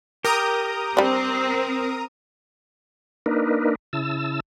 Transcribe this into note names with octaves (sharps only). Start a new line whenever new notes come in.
G4 A#4 A#5 D#6
G3 C4 D4
A#3 D4 D#4 A#4 B4
C#3 E4 A5 E6